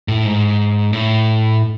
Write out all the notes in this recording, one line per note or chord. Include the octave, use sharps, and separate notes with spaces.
A2
G#2
A2